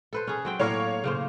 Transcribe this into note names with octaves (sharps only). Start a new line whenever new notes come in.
A4 B4 C5
C#4 G#4
F#3 C4 G5
A2 A#3 A#4 C#5 F5 C#6
C#3 A#3 C5